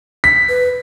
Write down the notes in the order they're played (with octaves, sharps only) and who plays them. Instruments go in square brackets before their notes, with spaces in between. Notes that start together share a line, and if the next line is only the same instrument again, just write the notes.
[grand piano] B6
[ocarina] B4